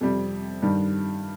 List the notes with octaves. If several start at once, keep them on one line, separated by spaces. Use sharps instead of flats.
F2 C3 G3
G2 D#3 G3